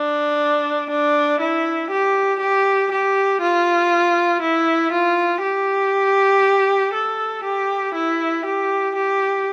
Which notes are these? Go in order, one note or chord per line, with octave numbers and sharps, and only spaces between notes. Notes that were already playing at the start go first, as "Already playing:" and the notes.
Already playing: D4
D4
E4
G4
G4
G4
F4
E4
F4
G4
A4
G4
E4
G4
G4